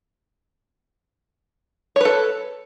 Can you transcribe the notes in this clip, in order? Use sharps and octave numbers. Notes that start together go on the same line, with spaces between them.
A4 B4 C#5